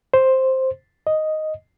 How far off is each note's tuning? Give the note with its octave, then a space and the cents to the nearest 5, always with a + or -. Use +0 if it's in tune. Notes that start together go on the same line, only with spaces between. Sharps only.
C5 +5
D#5 +0